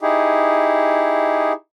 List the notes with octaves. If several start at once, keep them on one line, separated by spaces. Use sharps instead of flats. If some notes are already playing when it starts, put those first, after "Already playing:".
D#4 E4 G4 G#4